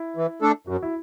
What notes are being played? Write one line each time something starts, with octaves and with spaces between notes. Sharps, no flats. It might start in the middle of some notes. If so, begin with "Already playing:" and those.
Already playing: E4
E3
A3 D4 A4
F#2 F#4
E4